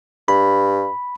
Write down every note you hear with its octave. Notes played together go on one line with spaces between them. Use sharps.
G2 B5